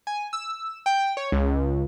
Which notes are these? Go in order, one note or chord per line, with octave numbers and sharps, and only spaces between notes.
G#5
E6
G5
C#5
C#2